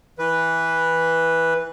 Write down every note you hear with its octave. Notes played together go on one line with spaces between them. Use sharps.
E3 B4